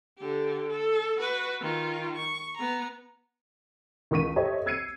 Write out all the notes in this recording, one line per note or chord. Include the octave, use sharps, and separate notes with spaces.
D3 G4
A4
F#4 B4
D#3 F4
C#6
B3 A#5
C#2 D#3 C#6 B6 D#7
G4 A4 C5 C#5 D#5 E5
E6 G#6 C7 C#7 D#7